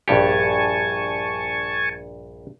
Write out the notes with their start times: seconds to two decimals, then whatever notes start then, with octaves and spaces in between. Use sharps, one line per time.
0.08 A#1 G2 G4 G#5 A5 C#6